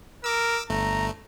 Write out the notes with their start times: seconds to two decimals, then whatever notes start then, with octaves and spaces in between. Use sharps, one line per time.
0.24 A#4 D6 E6
0.70 G1 A3 A#5